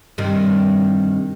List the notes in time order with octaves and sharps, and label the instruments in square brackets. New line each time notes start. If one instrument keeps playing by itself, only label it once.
[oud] G2 C3 D#3